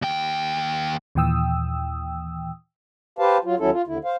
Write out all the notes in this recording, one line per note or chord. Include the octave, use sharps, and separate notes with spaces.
D#2 G5
D#2 A#2 E3 G5 D#6 E6
G4 B4 C5 F5 A5
F#3 F4
D#2 F#3 C#4 E4 A4
F4
D#2 D3 E4
C5 F5